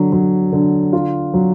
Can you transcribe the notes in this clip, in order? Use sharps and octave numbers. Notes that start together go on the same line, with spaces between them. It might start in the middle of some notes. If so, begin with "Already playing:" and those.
Already playing: D3 F#3
F#3
D3
F4
F#3